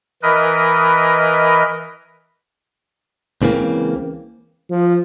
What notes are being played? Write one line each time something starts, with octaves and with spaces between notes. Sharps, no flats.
E3 A#4 B4 D#5
C#2 C#3 E3 A#3 C4
F3